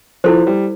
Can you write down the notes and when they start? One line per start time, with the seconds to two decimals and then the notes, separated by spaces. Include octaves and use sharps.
0.24 F3 E4 A4 C5
0.47 G3